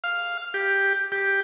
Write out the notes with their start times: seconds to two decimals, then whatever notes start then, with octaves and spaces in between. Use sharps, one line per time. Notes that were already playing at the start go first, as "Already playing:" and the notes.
0.04 F5
0.54 G4
1.12 G4